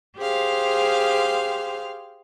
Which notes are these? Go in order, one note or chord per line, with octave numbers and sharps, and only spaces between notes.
G4 G#4 C5 F5